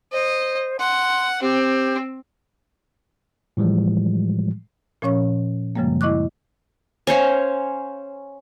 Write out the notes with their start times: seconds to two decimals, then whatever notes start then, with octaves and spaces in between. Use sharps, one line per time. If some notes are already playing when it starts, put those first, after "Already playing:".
0.12 C5 D#5
0.79 F#5 C6
1.42 C4 G4
3.57 A2 E3 F3 G3 G#3
5.02 A#2 F3 C#4 C#5 C#6
5.76 F#2 C#3 F3 G3 G#3 A#3
6.01 E4 D#5 C#6 D6 F#6
7.07 C#4 C5 C#5 F5